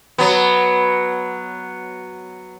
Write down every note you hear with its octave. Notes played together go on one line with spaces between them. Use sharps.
F#3 B3